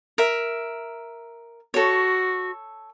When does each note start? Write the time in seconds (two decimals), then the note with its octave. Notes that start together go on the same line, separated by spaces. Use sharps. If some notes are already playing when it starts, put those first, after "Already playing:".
0.18 A#4 E5
1.74 F#4 A4 C#5